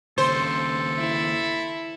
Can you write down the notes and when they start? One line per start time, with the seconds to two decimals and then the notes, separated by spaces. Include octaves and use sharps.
0.18 D#2 C#3 A4 C5
0.98 E4